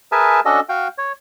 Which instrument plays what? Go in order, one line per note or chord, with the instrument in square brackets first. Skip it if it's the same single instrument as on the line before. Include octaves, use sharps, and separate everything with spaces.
[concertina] G#4 A#4 B4 E5 G#5 A5
C#4 D4 F#4 A4 D#5
F#4 F5 G5
C#5